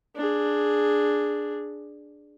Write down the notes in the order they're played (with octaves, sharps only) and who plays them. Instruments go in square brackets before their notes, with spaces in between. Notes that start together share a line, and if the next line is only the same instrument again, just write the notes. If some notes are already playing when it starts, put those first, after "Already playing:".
[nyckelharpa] D4 G#4